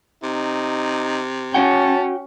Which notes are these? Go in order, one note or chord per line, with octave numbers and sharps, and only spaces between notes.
C3 D#4
C#4 F#4 F#5 G5 A5